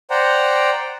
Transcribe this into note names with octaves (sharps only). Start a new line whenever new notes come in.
C5 D5 F#5 G5 A#5